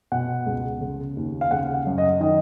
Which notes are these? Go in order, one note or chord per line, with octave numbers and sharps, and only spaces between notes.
B2 F#5
C#2
C#3
D#2
F5
C#3 F#5
F#5
F#2
D#5
D#3 D#5